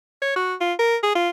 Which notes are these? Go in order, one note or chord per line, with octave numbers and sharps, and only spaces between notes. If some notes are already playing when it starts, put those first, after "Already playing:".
C#5
F#4
F4
A#4
G#4
F4